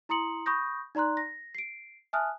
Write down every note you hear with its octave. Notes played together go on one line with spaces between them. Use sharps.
E4 A#5 C6 D#6 C#7 F#7
B5 C#6 D#6 G6 A#6
D#4 D5 A#5 C6 F#6
A#6
C7 D7
E5 G#5 A5 D#6 F6 F#6